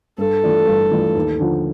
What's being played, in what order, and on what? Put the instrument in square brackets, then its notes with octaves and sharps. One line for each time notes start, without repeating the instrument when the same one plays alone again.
[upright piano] G2 [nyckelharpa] A4
[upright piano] E3 A3 D4 F4
G2
E3 A3 D4 F4
D#2
D3 F3